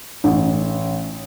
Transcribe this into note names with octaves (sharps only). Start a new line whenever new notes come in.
A1